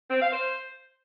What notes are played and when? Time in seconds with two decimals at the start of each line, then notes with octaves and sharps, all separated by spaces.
0.10 C4
0.21 F5
0.32 C5